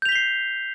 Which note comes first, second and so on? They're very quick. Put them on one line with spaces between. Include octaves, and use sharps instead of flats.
G6 F7 B6 G7 C7